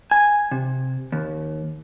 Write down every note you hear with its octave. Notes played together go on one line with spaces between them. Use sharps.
G#5
C3
D#2